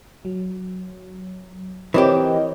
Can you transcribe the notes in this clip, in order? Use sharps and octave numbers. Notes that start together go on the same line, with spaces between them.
F#3
E3 C4 G4 A#4 C#5 D#5